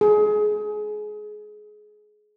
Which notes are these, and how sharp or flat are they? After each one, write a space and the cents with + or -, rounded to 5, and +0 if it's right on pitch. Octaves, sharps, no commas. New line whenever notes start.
G#4 +25